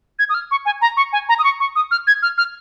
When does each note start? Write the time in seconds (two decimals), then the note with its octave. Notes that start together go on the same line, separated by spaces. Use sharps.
0.19 G#6
0.29 D#6
0.34 F6
0.51 C#6
0.66 G#5
0.82 A#5
0.97 C#6
1.13 G#5
1.29 A#5
1.39 D#6
1.44 C#6
1.60 C#6
1.76 D#6
1.91 F6
2.07 G#6
2.22 F6
2.38 F6